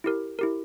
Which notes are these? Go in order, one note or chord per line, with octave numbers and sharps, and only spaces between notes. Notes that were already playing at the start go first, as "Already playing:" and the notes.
E4 G4 A#4
E4 G4 A#4